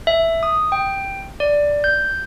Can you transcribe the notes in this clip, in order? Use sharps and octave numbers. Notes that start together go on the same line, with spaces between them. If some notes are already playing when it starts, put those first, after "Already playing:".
E5
D#6
G5
D5
G6